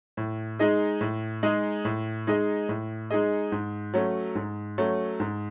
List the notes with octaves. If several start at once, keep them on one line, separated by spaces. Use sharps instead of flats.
A2
G#3 D#4 G#4 D#5
A2
G#3 D#4 G#4 D#5
A2
G#3 D#4 G#4 D#5
A2
G#3 D#4 G#4 D#5
G#2
F#3 A3 C#4
G#2
F#3 A3 C#4
G#2